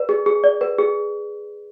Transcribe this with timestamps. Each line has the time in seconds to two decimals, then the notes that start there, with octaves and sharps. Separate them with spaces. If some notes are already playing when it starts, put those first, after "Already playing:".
Already playing: B4 D5
0.09 G#4
0.26 G#4
0.44 D5
0.61 B4
0.79 G#4